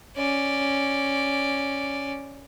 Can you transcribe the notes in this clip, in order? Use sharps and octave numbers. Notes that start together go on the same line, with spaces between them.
C#4 D5